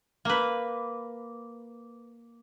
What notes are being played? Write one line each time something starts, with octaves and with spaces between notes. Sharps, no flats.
A#3 B4